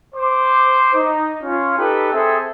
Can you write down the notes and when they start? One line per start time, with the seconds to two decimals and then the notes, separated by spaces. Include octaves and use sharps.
0.15 C5 D6
0.95 D#4
1.43 C#4 F4
1.77 D#4 G4 A4 B4
2.12 C4 G#4 A4 E5 G5